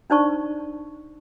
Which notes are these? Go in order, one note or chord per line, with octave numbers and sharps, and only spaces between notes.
D4 D#4 C5 D5 A5 C#6